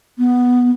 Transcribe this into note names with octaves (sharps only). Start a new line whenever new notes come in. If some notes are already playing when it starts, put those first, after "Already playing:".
B3